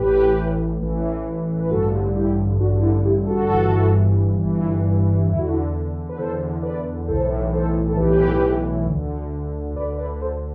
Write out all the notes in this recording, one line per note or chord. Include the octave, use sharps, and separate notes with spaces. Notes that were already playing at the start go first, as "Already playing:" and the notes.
Already playing: A1 A2 E3 G4 B4
A1 A2 E3
B4
A1 G2 D3 F#4 A4
E4 G4
A1 G2 D3 D4 F#4
E4
E4 G4
F#4 A4
G1 G2 E3
G1 G2 E3
E2 D3 E4
F#4
E4
B4
E2 D3 A4 C5
B4 D5
B1 A2 E3 A4 C5
A4 C5
A4
B1 A2 E3 G4 B4
D2 D3
D2 D3 B4 D5
B4 D5
A4 C5